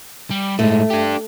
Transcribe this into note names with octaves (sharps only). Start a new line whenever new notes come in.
G3
A2 G#3 A3
D4 G4